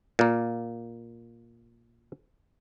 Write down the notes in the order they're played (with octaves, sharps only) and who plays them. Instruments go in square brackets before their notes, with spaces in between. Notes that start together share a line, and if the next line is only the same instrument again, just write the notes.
[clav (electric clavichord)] A#2 A#3